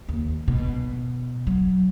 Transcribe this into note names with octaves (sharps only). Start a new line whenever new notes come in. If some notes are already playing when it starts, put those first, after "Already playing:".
D#2
B2
F#3